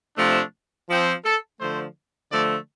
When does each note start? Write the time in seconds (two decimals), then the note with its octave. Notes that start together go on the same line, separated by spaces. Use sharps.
0.16 C3 F3 A3 D4
0.88 F3 C4
1.24 A4
1.59 D3 F3 A3 C5
2.31 D3 F3 A3 D5